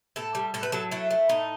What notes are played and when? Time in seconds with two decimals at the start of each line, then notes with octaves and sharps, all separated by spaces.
0.16 A2 A4
0.35 G3
0.54 A2 A4
0.63 B4
0.72 F#3 A4
0.91 A3 E4
1.11 A3
1.29 A2 D#4